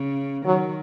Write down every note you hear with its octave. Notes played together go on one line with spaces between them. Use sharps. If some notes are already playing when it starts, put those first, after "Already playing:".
Already playing: C#3
D#3 F#3